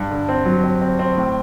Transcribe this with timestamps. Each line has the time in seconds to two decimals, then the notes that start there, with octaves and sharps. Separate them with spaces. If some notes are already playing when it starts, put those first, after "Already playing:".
Already playing: G2
0.11 D3
0.29 C4
0.46 F#3
0.64 C4
0.81 C4
0.99 C4
1.17 A2